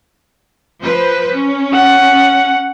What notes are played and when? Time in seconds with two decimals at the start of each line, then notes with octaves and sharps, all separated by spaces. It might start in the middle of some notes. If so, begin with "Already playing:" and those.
0.82 F3 B4 C5
1.32 C#4
1.72 F#5